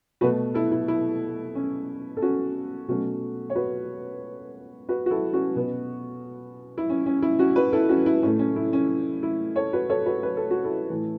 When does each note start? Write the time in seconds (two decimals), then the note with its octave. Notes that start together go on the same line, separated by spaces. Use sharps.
0.21 B2 A3 F#4 B4
0.54 E4 A4
0.71 E4
0.88 E4
1.55 C#4
2.17 A4
2.22 C#4 F#4
2.88 B2 F#3 A3 C#4 F#4
3.50 C#5
3.55 F#4 B4
4.89 F#4 B4
5.06 F#4
5.11 E4 A4
5.33 C#4 F#4
5.56 B2 B3
6.78 E4
6.89 C#4
7.06 C#4
7.22 E4
7.39 C#4 F#4
7.56 F#4 B4
7.73 E4 A4
7.89 C#4 F#4
8.06 E4
8.22 A2 A3 C#4
8.39 C#4
8.56 E4
8.73 C#4
9.23 E4
9.56 A4 C#5
9.73 F#4 B4
9.90 A4 C#5
10.06 F#4 B4
10.23 B4
10.37 A4
10.51 F#4
10.64 E4 A4
10.90 A2 E3 A3